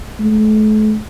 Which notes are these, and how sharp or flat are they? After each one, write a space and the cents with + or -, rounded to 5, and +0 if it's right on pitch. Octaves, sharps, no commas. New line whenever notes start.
A3 -40